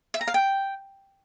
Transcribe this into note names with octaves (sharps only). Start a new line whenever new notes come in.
E5
A#5
F5
G5